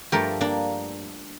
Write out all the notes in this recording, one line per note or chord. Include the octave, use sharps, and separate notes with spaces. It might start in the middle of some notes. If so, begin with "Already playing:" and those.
G2 F3 A3 G4 A#4
A#3 D4